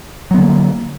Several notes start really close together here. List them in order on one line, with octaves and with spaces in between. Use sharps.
F#3 B3 D3 A#3